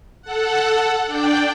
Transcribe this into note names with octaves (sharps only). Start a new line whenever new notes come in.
A4 F#5
D4 D5 G5